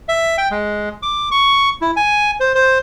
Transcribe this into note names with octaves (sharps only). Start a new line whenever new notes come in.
E5
G5
G#3
D6
C#6
E4
G#5
C5
C5